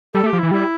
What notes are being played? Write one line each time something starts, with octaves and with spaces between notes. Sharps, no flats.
G3 A4
A3
G4
F3
E4
E3
G3 E4